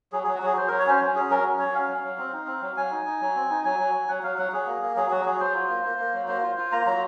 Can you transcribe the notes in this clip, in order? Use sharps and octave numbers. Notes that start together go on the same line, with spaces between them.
F#3 G#4
F#3 G#4
F#4
F#3 G#4
F#3 C5
F#3 A#4
C#5
C#4 C5
F#3
C#4 G#4
F#3 A#4
C#4
F#3 C#5
C#4 F5
F#3
F#3
C4
D#4
C4
F#3
F#3 G#5
D#4
D#4
F#3
C4
D#4
F#3 G#5
F#3
F#3
F#3 F#5
F#3 F5
F#3 F#5
F#3 G#4
A#3
A#3
F#3 G#4
F#3 F#4
F#3 G#4
F#3 C5
F4
A#3
A#3
A#3
F#3
A#3 C5
F4
F4
A#3 A#5
F#3 A#5